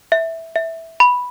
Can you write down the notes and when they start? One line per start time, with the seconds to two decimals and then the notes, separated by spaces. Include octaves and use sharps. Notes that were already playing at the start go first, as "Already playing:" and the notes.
0.12 E5
0.56 E5
1.00 B5